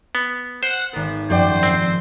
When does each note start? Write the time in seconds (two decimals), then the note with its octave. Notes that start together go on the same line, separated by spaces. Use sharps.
0.15 B3
0.63 C5 F#5
0.93 G#1 B3 A#4
1.30 F#2 F3 C5 D5 G5
1.63 C4